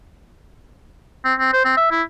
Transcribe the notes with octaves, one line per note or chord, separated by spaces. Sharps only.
C4
C4
C5
C4
E5
E4